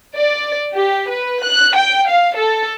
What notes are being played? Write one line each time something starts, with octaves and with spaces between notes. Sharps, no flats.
D5
G4
B4
F#6
G5
F5
A4